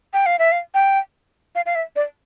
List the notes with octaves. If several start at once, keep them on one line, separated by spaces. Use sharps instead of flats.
G5
F5
E5
F5
G5
F5
F5
E5
D5